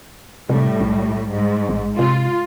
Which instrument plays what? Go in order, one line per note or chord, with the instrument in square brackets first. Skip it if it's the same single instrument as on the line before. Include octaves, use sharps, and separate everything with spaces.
[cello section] A2 G3 [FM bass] C3
[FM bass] B1
[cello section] G#2
[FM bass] A1
[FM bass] C3 [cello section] F4